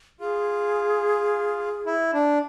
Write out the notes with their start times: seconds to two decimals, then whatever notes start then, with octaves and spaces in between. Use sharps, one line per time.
0.20 F4 G#4
1.86 E4
2.14 D4